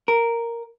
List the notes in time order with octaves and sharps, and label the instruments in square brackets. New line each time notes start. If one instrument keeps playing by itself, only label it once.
[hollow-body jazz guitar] A#4